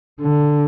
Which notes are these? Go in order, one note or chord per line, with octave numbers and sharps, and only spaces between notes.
D3